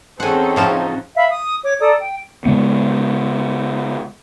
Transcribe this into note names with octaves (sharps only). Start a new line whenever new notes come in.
E2 C4 C#4 D#4 A4 C5 F#5 G#5
A2 C#3 F3 F4 F#4 A5
E5 F5 B5 E6
D#6
C#5 D6
A4 D5 A#5 D#6
G5
C#3 G#3 B3